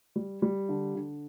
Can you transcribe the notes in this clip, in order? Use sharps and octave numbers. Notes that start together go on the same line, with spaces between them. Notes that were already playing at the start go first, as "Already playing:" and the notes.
G3
G3
D3
D3